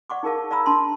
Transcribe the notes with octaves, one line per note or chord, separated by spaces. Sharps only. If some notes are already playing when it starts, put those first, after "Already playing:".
D5 F#5 C#6 D6
D#4 G#4 A#4 F5 A5
D5 F5 A#5 B5 E6
D4 A5 C6